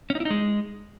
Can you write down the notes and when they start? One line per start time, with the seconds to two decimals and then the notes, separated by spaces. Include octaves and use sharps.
0.10 C#4
0.15 D#4
0.20 E4
0.25 D#4
0.30 G#3